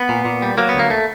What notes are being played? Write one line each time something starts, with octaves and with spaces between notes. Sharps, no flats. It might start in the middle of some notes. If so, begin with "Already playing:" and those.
Already playing: B3
A#2
A#2
G3
F#3 A#3
B3
D2 A#3
A3